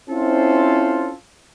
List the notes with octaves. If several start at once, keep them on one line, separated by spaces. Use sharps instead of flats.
C4 C#4 E4 F4 A4 C5